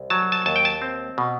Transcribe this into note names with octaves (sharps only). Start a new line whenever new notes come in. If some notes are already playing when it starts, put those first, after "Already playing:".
Already playing: C2
F#3 A5
A5
D#2 A5
G5
A5
C4
B2